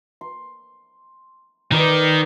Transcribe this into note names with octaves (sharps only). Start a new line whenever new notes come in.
C6
D#3 A#4 B4 D5